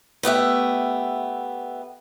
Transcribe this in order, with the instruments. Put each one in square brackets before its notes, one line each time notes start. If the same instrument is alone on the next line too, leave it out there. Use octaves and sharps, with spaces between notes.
[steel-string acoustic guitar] A3 B3 G4 E5